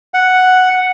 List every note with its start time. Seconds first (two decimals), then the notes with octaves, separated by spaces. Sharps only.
0.14 F#5